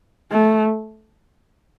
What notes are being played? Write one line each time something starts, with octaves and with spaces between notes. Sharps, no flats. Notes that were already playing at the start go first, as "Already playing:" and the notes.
A3